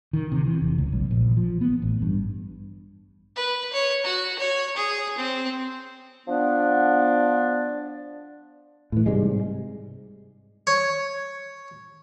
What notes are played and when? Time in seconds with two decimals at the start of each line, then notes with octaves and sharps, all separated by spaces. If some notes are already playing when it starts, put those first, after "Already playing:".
0.13 D#3
0.32 C3
0.46 E3
0.62 F1
0.78 C#2
0.92 B1
1.11 A#1
1.37 F3
1.61 B3
1.82 A1
2.02 G2
3.36 B4
3.73 C#5
4.04 F#4
4.39 C#5
4.76 G#4
5.18 C4
6.27 F3 B3 D4 D5
8.92 A2 E3
9.06 G#2 C3 G3 G#3
10.67 C#5